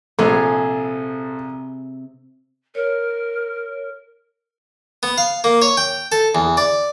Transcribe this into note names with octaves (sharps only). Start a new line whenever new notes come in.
A#1 C3 G#4 A4 C5 G#5
A#4 C#5
B3
F5
A#3
C#5
G5
A4
E2
D5